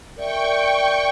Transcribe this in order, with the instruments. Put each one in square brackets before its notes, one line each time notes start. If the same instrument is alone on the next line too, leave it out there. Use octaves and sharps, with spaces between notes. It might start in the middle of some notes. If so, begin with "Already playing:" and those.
[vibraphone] A#4 D5 E5 [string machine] G5 C#6